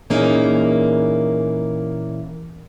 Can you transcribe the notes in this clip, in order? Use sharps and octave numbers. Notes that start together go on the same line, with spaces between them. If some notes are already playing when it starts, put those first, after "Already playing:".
A#2 E3 A#3 C#4 D#4 G#4